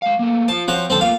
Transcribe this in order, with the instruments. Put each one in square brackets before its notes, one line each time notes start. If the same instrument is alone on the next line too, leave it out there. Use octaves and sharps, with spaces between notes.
[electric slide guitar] G#3 F5
A3 A#3
[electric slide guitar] F4 C5 [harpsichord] A5
[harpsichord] F3 F#4 C#5 [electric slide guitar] C4
[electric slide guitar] F#2 A#2 D#3 [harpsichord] C4 A4
[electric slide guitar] A3 A#3 F4 [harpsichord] F5